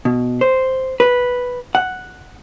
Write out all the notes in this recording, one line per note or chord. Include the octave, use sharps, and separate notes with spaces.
B2
C5
B4
F#5